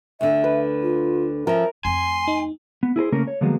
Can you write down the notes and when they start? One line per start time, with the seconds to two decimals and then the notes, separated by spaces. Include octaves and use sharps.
0.21 D2 D3 E5
0.44 B4
0.82 F4
1.47 F3 C#4 A#4 E5
1.85 F2 A3 G#5 C6
2.28 D#4
2.83 B3
2.96 E4 G#4 A#4 C5
3.12 C#3 A3 A#3 C#4 A#4
3.27 C#5
3.41 D3 F3 F#3 G#3 A#3 B3